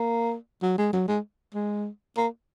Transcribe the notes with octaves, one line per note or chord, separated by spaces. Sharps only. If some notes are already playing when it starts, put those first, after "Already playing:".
Already playing: A#3
F#3
G#3
F#3
G#3
G#3
A#3